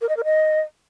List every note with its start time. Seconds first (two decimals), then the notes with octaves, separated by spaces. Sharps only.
0.01 A#4
0.09 D#5
0.17 A#4
0.24 D#5